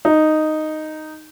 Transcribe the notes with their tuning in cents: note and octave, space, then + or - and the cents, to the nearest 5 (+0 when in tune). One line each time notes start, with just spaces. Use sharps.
D#4 -5